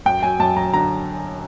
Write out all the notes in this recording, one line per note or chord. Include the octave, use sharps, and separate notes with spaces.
F#2 G5
F#3 G#5
F#2 A5
F#2 A#5
D3 A#5